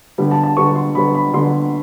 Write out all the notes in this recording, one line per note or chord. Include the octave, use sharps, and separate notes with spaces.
D3 G3 B3
A5
A5
D3 G3 B3 C#6
C6
D3 G3 B3 B5
B5
D3 G3 B3 C6